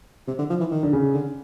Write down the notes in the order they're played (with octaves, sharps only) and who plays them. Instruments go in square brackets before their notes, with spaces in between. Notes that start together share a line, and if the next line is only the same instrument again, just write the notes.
[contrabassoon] C3
D3
F3
E3
D#3
[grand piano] D3
C#3
[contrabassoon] D3